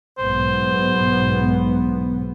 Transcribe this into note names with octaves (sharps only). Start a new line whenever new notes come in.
B1 G#2 B3 C5